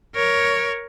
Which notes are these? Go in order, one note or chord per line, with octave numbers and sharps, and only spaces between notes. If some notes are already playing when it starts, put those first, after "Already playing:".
A#4 C#5